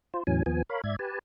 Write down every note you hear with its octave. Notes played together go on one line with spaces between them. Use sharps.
F4 C5
E2 A2 E3 F#3 C#4 G#5
D#2 F3 B3 G#5
A#4 C#5 F5 B5
G#2 D5 E5 G#6
G4 B4 G#5 A5